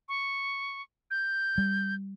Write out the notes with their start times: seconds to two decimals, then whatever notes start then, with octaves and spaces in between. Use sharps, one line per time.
0.09 C#6
1.11 G6
1.58 G3